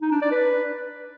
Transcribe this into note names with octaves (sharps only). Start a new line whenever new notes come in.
D#4
D4
D5
B4